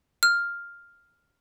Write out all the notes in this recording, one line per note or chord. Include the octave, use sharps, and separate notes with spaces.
F6